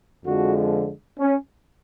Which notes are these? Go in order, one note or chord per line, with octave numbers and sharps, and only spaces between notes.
F2 D3 F3 G#3 F#4
C#4